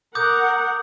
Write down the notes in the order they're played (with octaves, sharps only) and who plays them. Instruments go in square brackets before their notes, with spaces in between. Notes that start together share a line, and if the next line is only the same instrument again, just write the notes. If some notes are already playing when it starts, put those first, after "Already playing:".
[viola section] A#4 F#5 [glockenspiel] D6 D#6 G6